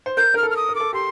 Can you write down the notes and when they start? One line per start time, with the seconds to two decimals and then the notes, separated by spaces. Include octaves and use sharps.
0.06 C5
0.17 A#4 G6
0.34 A#4 F6
0.43 A4
0.50 F6
0.56 D#6
0.69 A#4
0.75 A4 D6
0.93 G4 C6